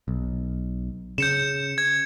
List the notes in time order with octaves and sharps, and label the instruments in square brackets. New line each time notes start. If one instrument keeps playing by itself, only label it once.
[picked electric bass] B1
[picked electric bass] C#3 [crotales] G6 C#7 E7
[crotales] G#6